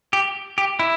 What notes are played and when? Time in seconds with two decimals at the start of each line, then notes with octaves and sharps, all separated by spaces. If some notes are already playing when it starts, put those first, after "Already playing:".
0.13 G4
0.58 G4
0.79 E4